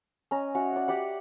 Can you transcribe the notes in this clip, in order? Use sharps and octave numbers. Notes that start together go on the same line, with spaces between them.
C#4 D#5 A#5
C#4 F#4 E5 F#5
D5 F#5
G4 D5 F#5